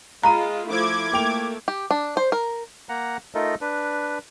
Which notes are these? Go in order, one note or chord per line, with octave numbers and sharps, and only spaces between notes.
G#3 F4 F5 A#5 B5 D#7
F3 A3 E4 D6 G#6
A3 A#3 G5 F7
G4
D4
C5
A#4
A#3 F#5 A#5
A3 D#4 F4 A4 A#4 D#5
D4 B4